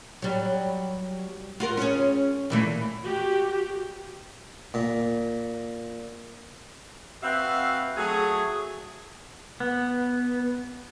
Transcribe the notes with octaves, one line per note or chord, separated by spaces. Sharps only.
F#3 G3
F4 F#4 A#4
C#4 G#4
A#2 E3 A3
F#4 G4
A#2
C4 F#4 B4 E5 F5
F#3 A3 G#4
B3